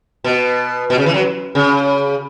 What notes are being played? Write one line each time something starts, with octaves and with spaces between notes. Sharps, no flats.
B2
B2
C#3
E3
F#3
C#3